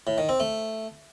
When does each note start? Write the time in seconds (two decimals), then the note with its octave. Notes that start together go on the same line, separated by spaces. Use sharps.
0.07 A2
0.18 D#3
0.29 C4
0.40 A3